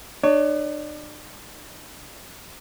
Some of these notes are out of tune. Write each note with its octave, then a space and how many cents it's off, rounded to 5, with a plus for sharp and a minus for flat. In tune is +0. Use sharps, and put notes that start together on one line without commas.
D4 +40 C#5 +25